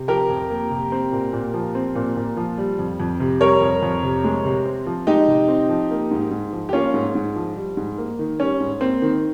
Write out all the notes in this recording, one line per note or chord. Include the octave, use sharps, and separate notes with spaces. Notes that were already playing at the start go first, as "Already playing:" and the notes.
Already playing: C3
F3 G4 A#4
F2
A#3
C3
C4
A#2
A#2
F3
C4
A#2
A#2
F3
G3
F2
F2
C3
G3 A#4 C#5
F2
F2
C3
G#3
C3
C4
F3
G#3 D#4 G4
C3
C4
F3
A#3
G#2
G#2
F3
G4
A#3 C#4 F4
G#2
G#2
F3
G3
G#2
A#3
D#3
G3 C#4
G#2
A#3 C4
D#3